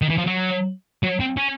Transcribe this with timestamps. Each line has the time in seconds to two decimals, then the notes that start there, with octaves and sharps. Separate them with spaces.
0.02 D#3
0.09 E3
0.18 F3
0.27 F#3
1.03 F#3
1.20 C4
1.37 C#4